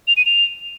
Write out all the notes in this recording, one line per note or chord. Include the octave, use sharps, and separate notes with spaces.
F7
D#7
F7